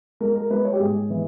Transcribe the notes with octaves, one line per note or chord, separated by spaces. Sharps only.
G#3 A#4
A#4
G#3 B4
C#5
G4
G#2 G#4
E3